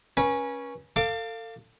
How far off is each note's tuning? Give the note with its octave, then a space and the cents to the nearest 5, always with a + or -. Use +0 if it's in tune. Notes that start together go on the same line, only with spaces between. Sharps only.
C#4 +0 B4 -40
A4 +35 F5 -5 D6 +0